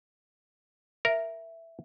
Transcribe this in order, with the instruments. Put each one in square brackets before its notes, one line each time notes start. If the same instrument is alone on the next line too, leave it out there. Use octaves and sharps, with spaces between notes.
[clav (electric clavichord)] A#4 [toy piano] E5